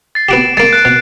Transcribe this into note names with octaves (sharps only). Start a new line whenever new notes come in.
A6 C7
B3 F#4 G4 D7 E7
G#3 A#3 A6 C7 D7
F#6 C7 D7
B2